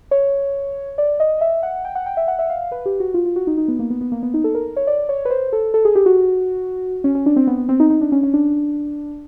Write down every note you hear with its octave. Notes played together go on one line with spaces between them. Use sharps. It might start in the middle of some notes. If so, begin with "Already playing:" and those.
C#5
D5
D#5
E5
F#5
G5
F#5
G5
E5
F#5
E5
F5
B4
G4
F#4
F4
F4
F#4
D#4
D#4
B3
A#3
B3
B3
A#3
B3
D#4
A4
A#4
C#5
D5
C#5
B4
C5
A4
A4
G#4
G4
F#4
C#4
C#4
D4
C4
B3
B3
C4
D#4
D#4
D4
C#4
C#4
D4